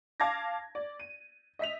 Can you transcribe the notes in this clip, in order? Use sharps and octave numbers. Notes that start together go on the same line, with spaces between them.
F5 A5 D6 G#6 A#6
D5
D#7
D#5 E5 B6 F7